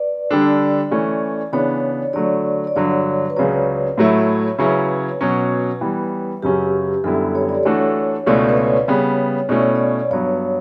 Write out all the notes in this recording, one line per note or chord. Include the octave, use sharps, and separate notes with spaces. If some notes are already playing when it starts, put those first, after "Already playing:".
Already playing: B4 D5
D3 G3 D4 A4
E3 A3 C#4
C#3 E3 B3 D4 C#5
D3 F#3 A3 D5
D5
G2 D3 F#3 C#5
B4
C#2 C#3 F#3 C#5
A2 F#3 A3 E4
C#3 F#3 C#4 E4 B4
B2 F#3 C#4
E3 G3 B3
F#2 C#3 F#3 C#4 G4
F#2 D3 G3 B3 E4 A4
C#5
D5
E3 A3 D4 F#4 A4 C#5
C#2 B2 A3 C#4 E4 D5
B4
C#5
C#3 G3 B3 C#5
B2 A3 C#4 E4 D5
C#5
D5
G2 F#3 B3 C#5